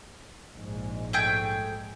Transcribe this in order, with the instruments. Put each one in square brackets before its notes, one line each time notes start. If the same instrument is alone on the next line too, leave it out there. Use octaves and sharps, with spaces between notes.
[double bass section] A#1 G#2 G#3
[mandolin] A3 G#4 G5